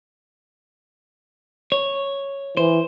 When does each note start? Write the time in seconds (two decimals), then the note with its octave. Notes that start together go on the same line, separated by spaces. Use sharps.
1.72 C#5
2.57 E3 C5